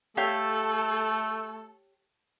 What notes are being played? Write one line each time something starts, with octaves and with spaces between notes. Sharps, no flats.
A3 G4 A4 C#5 F5